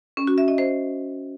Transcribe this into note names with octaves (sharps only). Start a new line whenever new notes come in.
C#4
F#4
E5
D#5
C5